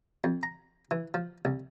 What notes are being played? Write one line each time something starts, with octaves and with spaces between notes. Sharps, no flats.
F2
A#5
E3
F3
C2